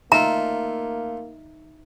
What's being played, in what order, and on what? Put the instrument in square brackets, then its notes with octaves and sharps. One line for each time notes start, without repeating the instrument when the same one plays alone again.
[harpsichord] A3 F4 [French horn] A#3 [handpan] D#4 E5 [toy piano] A#5